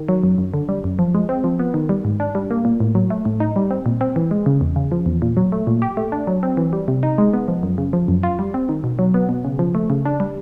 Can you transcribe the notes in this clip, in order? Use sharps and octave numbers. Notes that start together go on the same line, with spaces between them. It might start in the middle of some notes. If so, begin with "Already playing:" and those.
Already playing: D#3
F#3
F#2
F#2
D3
G3
F#2
F3
G#3
C4
F3
B3
D#3
G3
G#2
D4
G3
A#3
A#2
A2
F#3
A3
A2
D#4
G3
C4
A#2
C4
E3
G#3
C#3
E2
C#3
F3
E2
A#2
F#3
A3
A#2
G4
A3
D4
F#3
C4
E3
G3
C3
D#4
G#3
B3
F3
F#2
C#3
F3
F#2
F4
G3
C4
D#3
B2
F#3
B3
B2
C#3
F3
A3
C#3
D4
G3